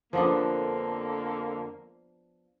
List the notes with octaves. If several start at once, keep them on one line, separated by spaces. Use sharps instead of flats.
F2 D3 F3 A#3 B3 D4